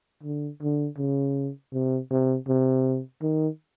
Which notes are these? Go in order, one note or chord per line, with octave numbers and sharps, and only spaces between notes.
D3
D3
C#3
C3
C3
C3
D#3